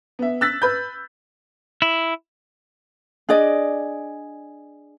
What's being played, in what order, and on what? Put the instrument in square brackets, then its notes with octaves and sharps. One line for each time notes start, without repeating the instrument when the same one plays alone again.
[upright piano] B3 E5
E6 F#6 A6 B6
B4 B5 G6
[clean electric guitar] E4
[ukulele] D4 G#4 D5 D#5